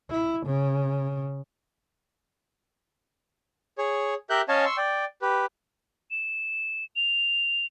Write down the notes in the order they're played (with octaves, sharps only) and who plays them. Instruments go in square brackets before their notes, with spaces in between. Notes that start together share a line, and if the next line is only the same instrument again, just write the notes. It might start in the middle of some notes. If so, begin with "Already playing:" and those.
[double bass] E4
C#3
[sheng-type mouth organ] G#4 C#5
G4 A#4 E5 F#6 G6
C#4 C#5 D#5 F5 G#5 A5
C6 C#6 E6
D5 G5
G4 B4
[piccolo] E7
F7